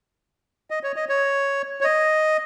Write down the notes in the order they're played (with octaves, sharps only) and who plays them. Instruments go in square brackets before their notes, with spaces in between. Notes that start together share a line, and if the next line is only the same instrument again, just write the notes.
[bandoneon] D#5
C#5
D#5
C#5
C#5
D#5